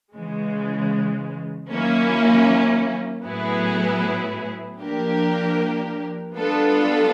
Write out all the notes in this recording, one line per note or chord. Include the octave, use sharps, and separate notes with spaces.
C#3 E3 G#3
D#3 F#3 A#3 C#4 E4
A2 F#3 B3 E4 G#4
F3 A#3 D4 G4 A#4
G3 B3 D4 F4 A4